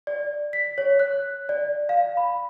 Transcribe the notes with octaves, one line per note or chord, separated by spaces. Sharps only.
D5
B6
C#5
F#6
D5
F5
B5